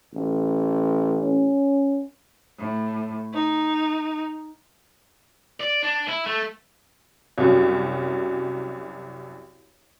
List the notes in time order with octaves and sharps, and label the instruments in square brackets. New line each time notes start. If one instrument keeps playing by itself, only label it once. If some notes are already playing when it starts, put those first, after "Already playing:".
[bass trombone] A1
[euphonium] C#4
[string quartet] A2
D#4
[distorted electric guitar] D5
D4
E4
A3
[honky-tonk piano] C2 F#2